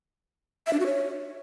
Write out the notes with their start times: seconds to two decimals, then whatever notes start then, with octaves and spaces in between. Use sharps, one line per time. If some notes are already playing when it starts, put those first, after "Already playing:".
0.67 E5
0.73 D4
0.80 F#4
0.86 C#5